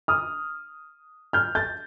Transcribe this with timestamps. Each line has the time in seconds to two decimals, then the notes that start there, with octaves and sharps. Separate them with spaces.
0.08 D#6 F6
1.33 F6 G6
1.55 G6 A6